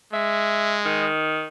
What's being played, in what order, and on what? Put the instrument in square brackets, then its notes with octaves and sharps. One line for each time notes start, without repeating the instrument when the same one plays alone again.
[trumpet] G#3 [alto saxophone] E5
[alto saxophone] D#3